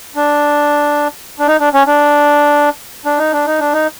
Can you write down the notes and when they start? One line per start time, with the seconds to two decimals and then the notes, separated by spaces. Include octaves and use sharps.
0.16 D4
1.39 D4
1.48 D#4
1.60 D4
1.74 C#4
1.87 D4
3.05 D4
3.18 D#4
3.32 D4
3.46 D#4
3.60 D4
3.74 D#4